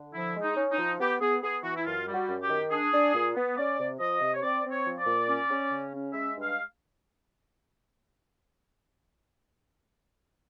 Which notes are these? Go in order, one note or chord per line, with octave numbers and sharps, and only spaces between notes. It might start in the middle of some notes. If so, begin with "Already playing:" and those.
Already playing: D3
F3 E4
G#3
D#4
C#4
D#4
F3
B3 G4
B3 G#4
B3 G#4
E3 F#4
E4
F#2 F4
G3
F#4
F#2
G4
D#3
D4 G#4
D4
A#2
B3
C#4 D5
C3
F3 D#5
C3
C#5
C4 D5
C4
C#5
F3
D5
A#2
C#4
C#4
C#3
C#4
G#3 E5
G2
F5